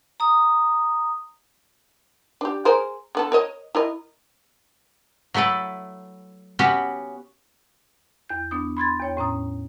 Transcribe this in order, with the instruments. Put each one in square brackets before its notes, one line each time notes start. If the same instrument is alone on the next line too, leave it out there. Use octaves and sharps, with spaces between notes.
[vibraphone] A#5 D#6
[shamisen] D4 G4
G#4 A#4 C5
D3 B3 A4
A#4 C#5 D#5
E4 A#4 D#5
[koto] F#3 A3 E4 A4 B4
B3 C#4 F#4 G4
[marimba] E2 G6
B3 D4 D#6
B5 C6 G#6 A6
E2 C#5 G5
A2 C#4 A#5 D#6